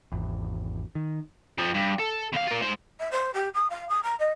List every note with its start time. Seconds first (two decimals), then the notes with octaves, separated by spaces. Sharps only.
0.12 G#1 E2
0.95 D#3
1.58 F2 F3
1.74 G2
1.99 A4
2.33 E2 F5
2.48 F4 A#4
2.62 G#3 C5
3.00 E5
3.11 C5
3.34 G4
3.54 D#6
3.70 F5
3.89 D#6
4.03 A#5
4.19 D#5